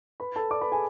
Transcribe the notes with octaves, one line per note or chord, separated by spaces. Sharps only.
B4 B5
A4 A5
D5 D6
B4 B5
G#4 G#5